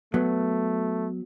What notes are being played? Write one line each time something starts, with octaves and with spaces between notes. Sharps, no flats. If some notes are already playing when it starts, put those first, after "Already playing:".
F#3 A3 B3